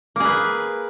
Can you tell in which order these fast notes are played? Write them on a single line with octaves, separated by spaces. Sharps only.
A#3 G#4 B4